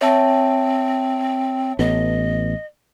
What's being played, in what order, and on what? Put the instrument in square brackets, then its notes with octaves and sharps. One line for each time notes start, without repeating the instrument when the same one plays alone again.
[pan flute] C4 [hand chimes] C#5 E5 A5
[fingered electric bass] A1 B3 [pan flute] D#5